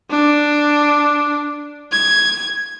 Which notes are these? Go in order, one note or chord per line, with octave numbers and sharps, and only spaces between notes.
D4
G#6